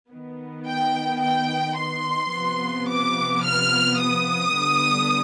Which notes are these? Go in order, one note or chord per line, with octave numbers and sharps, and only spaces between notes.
D#3 B3
G5
G5
C6
C3 F3 B3
D6
F6
D#6
D3 G3 B3